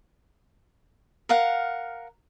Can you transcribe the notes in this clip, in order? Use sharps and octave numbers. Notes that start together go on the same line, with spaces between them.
A#4 F5 F#5